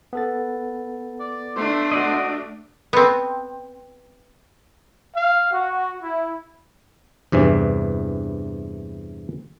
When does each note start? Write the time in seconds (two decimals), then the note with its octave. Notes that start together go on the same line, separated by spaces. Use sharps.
0.13 B3 A4 A6
1.20 D5
1.56 A3 D4 C5
1.92 F#4 D5 D#5
2.93 B3 C4
5.15 F5
5.51 F#4
6.01 E4
7.32 E2 G2 C3 E3